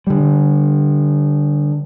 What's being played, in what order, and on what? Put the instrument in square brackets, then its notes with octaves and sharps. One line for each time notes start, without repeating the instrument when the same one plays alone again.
[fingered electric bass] D3 G3